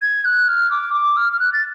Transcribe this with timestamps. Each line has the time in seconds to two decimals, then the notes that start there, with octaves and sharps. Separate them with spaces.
0.02 G#6
0.25 F#6
0.48 F6
0.71 D6
0.94 D6
1.16 F6
1.32 F6
1.40 F#6
1.53 A6